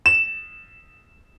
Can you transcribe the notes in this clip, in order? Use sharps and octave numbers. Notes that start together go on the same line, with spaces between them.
E7